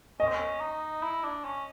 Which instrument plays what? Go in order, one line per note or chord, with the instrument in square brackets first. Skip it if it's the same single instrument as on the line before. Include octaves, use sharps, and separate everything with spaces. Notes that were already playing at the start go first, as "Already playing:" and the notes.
[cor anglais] C#4 [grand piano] D#5
[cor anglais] C4
C#4
D#4
E4
D4
C#4